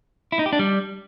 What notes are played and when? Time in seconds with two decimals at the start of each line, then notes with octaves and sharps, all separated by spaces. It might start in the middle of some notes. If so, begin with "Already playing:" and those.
0.32 E4
0.39 D#4
0.46 G4
0.53 D4
0.59 G3